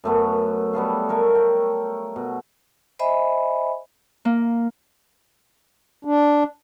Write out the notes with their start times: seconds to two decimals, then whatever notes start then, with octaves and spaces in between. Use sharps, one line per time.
0.04 F#2 A3 B3
0.73 G3 B3 A4 F5
1.09 A3 A#4 C#5
1.35 G5
2.16 B2
2.99 C5 D#5 E5 G#5 B5
4.25 A#3
6.05 D4